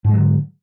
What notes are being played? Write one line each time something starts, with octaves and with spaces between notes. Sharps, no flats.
G#2 D3 F#3 G#3